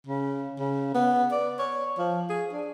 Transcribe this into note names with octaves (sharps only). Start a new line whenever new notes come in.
C#3
C#3
B3
D5
C#5
F3
G#4
D4